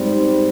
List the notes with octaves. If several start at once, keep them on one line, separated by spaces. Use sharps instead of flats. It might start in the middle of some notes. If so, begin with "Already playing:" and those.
Already playing: G#2 G3 C4